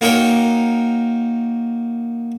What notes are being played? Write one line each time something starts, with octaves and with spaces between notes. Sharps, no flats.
A#3 D#4 F#4 A#4 C#5 G5